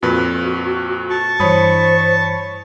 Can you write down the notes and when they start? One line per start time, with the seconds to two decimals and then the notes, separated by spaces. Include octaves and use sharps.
0.03 F2 A#2 F#4 B4
1.10 A5 C#6
1.40 G2 E3 C5 C#5 B5 D#6